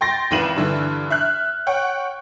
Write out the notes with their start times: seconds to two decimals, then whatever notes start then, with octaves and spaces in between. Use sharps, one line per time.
0.01 G5 C6 A6 A#6
0.31 G#1 C#2 E3 D#7 E7 F#7
0.56 G2 D3 E3
1.10 E5 F6 F#6
1.67 C#5 F#5 G5